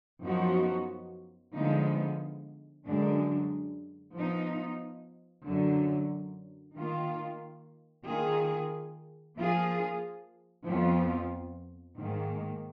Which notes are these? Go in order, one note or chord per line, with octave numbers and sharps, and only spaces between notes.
F#2 F3 B3 D#4 F#4
D3 F3 G#3 B3 D#4
F#2 D3 G#3 D4
F3 B3 D#4
F#2 D3 F#3
D#3 A#3 F4
D#3 A#3 F4 G#4
F3 A#3 F4 G#4
F2 F3 B3 F4
G#2 D#3 A#3